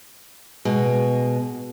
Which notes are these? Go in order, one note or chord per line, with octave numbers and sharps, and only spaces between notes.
B2 G#3 G#4